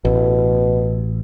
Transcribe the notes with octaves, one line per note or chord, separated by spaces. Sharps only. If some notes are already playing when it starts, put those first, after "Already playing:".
A1 B2